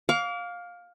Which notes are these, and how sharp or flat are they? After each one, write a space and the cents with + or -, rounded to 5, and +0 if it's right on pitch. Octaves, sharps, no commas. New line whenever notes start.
F5 +15 D6 -35